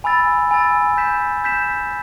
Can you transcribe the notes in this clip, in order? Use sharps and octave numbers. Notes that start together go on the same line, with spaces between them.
G#5 B5 E6 A6
G#5 B5 E6 A6
G6 B6 E7
G6 B6 E7